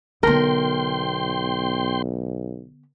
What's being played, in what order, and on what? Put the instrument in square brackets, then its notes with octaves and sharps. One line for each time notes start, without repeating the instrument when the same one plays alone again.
[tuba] B1 [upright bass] D3 B3 [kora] A#4 [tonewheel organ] G5 C6